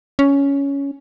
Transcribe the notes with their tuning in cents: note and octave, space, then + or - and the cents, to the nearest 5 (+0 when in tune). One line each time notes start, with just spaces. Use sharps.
C#4 +10